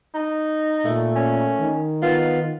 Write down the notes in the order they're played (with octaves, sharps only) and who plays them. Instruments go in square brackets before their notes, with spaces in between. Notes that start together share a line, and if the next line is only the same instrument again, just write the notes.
[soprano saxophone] D#4
[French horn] A#2 [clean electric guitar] A3
[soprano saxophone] C#4
[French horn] D#3
[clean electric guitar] B3 [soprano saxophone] F4